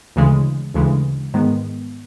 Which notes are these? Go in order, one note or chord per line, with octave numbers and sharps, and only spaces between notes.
D2 C#3 E3 G#3
D2 C#3 E3 G#3
G#2 D#3 G#3 B3